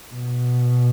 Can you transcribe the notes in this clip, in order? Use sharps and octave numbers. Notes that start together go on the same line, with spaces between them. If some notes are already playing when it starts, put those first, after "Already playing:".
B2